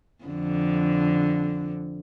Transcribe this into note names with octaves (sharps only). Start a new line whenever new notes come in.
F2 D3